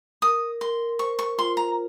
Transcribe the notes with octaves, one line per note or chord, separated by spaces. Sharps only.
A#4 D#6
A#4 C6
C5 C#6
C#6
F4 C6
A#5